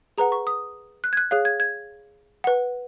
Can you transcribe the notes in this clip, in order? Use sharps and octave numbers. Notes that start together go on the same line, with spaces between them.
G#4 B4 F#5 A#5
C#6
D#6
F#6
G#6
F#6
G#4 C#5 F5 F#6
G#6
G#6
B4 F#5